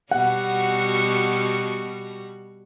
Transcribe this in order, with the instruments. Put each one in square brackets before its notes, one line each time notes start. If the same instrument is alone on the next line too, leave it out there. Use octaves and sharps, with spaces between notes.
[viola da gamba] B2 G3 F#4 [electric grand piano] F#5